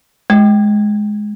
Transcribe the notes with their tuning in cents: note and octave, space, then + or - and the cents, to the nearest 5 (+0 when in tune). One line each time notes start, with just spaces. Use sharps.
G#3 +10